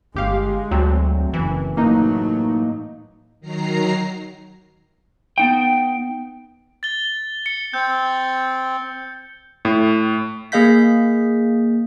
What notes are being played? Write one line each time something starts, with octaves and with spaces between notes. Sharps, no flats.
G1 G#3 G4 F5
D2 F#3 C4
F#1 E3
A2 F#3 A#3 D#4
D#3 F#3 A#5 C7
B3 D#4 G5
A6 G7
C#7
C4 G6
A2
A#3 G#4 D#5 F5 G6 B6